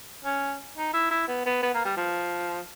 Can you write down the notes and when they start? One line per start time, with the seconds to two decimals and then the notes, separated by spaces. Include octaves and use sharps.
0.25 C#4
0.77 D#4
0.94 E4
1.11 E4
1.28 B3
1.46 B3
1.63 B3
1.74 A#3
1.85 G3
1.97 F3